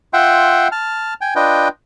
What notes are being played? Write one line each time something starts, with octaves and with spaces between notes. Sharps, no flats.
F4 E5 F#5 G5 C6
A5 F6
G5 G#5
D4 F4 B4 D#5 G5